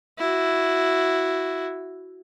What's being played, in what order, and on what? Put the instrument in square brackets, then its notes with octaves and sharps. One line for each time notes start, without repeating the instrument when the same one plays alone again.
[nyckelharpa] E4 F#4